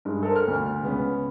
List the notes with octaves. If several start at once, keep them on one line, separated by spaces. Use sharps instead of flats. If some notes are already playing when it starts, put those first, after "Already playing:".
G2 G#3
A4 A#4 C5
F6
D2
C#2 B3 C#4